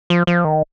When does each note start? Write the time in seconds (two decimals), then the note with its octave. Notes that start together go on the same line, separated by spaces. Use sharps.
0.10 F3
0.27 F3
0.45 D#3